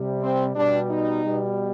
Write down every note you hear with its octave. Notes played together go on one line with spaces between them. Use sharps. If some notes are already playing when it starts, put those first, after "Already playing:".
Already playing: C3 G3
C4
B2 G3 D4
D#4
B2 G3